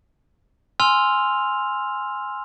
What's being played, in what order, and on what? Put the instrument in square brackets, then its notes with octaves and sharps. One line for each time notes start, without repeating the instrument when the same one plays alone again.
[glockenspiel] G#5 C6 E6 F6 F7